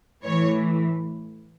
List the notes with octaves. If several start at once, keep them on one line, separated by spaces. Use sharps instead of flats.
A2 E3 C#5